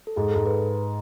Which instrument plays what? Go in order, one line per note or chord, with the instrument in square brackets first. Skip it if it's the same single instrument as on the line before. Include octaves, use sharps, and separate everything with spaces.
[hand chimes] A4
[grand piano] G#2 [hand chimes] G#4
[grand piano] G#2 [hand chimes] A4
[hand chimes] B4